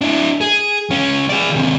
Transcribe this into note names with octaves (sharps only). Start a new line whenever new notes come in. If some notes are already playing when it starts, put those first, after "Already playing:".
D4 E4
G#4
C#2 C#4
G#4 D5
D#2 C3